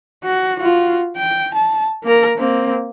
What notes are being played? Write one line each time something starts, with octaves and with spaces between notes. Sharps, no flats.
F#4
F4 F#4
G5
A5
A#3 A#4
A#3 C4